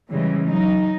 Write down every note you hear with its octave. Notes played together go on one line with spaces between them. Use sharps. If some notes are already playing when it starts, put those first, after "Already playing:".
C#3 E3 G3 G#3
F#3 D#4